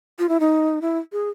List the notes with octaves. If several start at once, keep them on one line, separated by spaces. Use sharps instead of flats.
F4
E4
D#4
E4
G#4